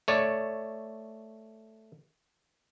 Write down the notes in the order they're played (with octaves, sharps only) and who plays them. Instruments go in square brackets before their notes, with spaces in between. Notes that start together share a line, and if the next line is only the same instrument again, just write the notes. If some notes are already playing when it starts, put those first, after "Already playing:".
[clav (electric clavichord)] A3 C#5 D5